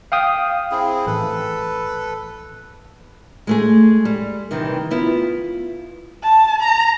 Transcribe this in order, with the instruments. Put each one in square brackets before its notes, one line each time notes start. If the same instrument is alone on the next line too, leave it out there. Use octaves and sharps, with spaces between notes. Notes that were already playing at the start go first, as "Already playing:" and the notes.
[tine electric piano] F5 G5 D#6
[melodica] C4 E4 G#4
[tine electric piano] A1 [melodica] A4 B4
[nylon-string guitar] G#3 A3 G#4
G3
C3 D#3 E3
B3 E4 F4
[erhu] A5
A#5